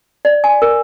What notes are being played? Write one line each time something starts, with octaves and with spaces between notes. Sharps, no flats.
D5
G#5
A#4